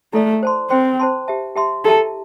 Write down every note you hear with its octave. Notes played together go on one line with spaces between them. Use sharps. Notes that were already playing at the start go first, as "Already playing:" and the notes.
A3 E4 A4 D5
C5 A5 C6
C4 C5 G5 C6
C5 A5 C6
G4 E5 A5
G4 E5 A5 C6
E4 G4 A4 E5 A5